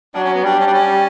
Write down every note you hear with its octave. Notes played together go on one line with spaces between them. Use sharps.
F#3 D4
C#4
B3
G3 D4
C#4
D4
C#4